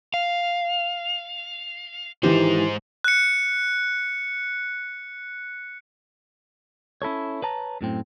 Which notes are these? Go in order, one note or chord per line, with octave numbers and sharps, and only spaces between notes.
F5
G#2 D#3 E3 G4 C5
F#6 C#7
C#4 E4 A4 C#5
B4 C#5 A5 A#5
F#2 A2 C4